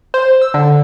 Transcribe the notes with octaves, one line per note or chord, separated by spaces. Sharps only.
C5
E6
D3